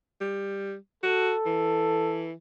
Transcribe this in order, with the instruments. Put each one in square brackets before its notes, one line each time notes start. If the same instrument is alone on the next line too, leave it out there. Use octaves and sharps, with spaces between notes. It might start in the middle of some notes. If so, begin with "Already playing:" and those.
[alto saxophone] G3
[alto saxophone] F#4 [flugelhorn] A4
[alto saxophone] E3